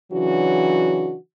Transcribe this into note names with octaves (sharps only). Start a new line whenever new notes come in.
C#3 E3 F#3 D4 F#4